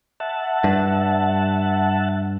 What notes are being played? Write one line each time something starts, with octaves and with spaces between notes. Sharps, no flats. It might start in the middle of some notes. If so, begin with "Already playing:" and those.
E5 F#5 A5
G2